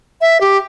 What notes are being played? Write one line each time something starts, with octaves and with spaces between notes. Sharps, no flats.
E5
G4